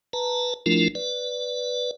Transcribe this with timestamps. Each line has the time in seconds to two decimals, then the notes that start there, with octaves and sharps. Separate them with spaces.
0.13 B4 A5 A#5
0.66 F3 A3 D4 E4 F4 A#4
0.95 B4 D5